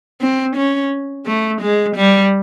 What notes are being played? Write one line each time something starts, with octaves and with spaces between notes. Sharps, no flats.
C4
C#4
A3
G#3
G3